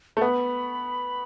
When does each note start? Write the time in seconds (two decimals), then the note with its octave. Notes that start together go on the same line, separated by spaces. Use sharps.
0.17 A3
0.21 B3 B5